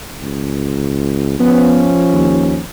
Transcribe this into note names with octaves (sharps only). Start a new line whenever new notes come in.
C#2
F3 B3 C#4
D#2